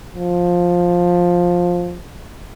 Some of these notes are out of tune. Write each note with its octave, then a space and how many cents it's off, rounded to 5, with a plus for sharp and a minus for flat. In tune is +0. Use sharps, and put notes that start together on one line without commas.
F3 +10